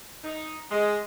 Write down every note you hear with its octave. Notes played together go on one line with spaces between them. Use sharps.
D#4
G#3